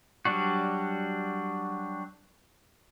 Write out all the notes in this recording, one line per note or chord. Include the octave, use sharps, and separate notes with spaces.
F#3 G3 D4 F#4